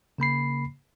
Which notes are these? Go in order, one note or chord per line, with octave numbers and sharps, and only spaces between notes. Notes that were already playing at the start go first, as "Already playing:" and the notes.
C#3 A#3 B5 C7